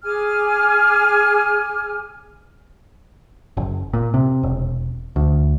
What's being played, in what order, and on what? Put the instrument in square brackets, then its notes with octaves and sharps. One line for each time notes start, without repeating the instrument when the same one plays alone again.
[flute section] G#4 G#5 D6 F6
[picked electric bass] F#1
A#2
C3
E1
D2